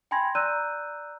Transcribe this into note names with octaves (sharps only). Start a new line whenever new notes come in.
G5 G#5 B5 C6 G#6 A#6
D5 A#5 E6 F#6 G6 D#7